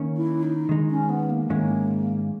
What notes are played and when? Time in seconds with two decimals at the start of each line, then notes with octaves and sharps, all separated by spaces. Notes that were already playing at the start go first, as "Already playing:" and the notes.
Already playing: D#3 A#3 C#4
0.16 E4
0.43 D#4
0.69 D#3 G#3 D#4
0.90 C#4
1.09 B3
1.30 A#3
1.50 G#2 D#3 G#3 C#4 E4